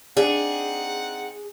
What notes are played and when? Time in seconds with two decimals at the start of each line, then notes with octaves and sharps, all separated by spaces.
0.17 C4 D4 D#4 G#4 F#5